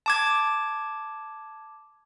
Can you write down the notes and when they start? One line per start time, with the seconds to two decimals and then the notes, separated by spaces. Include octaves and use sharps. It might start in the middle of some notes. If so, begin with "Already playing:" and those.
0.06 A5 D6 G#6